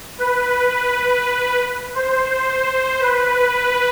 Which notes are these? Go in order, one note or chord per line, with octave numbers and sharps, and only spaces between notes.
B4
B4
C5
B4